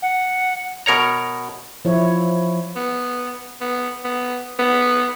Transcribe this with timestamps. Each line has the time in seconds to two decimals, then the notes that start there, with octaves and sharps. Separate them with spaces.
0.02 F#5
0.86 B2 A#4 C#5 A#5
1.85 F3 E4 C#5
2.76 B3
3.61 B3
4.05 B3
4.59 B3